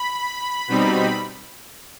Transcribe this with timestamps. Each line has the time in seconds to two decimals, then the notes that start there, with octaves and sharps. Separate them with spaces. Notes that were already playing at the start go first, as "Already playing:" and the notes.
Already playing: B5
0.68 B2 G3 C4 D#4